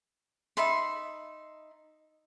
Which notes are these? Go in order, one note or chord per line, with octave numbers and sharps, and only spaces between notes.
D#4 E5 B5 C6